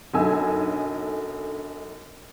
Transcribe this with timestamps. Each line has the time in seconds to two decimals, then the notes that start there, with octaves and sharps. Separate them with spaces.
0.14 B1 F#2 D3 D#4 G#5 E6